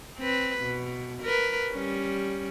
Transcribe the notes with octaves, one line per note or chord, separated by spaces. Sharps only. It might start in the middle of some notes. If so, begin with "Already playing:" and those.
C4 B4
B2
A#4 B4
G3 C#4